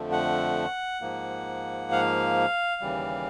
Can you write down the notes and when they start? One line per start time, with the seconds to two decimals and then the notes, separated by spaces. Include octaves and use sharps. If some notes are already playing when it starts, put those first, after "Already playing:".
Already playing: F2 D3 F3 A3
0.12 F#5
1.01 G#2 F3 A#3
1.92 F5
2.82 D#2 C#3 E3 G3